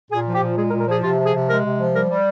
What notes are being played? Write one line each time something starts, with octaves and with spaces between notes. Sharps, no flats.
A#2 G#4
F3
G4
A#2
G#3 G#4
A#4
A#2
A#4
F3 G#4
C3 F4
F3
G#4
C3
G#3 A#4
C3
F3
G3 A#4
G3